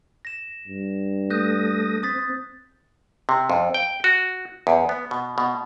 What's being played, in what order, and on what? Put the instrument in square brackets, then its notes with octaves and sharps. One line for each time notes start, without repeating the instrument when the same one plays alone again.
[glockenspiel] A#6 E7
[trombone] G2
[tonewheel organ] A3 D#6 A#6 [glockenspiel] F#6 G6
[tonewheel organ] C4 [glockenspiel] D#6 A6 B6
[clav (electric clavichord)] C3
F2
G5
F#4
E2
B3
B2
B2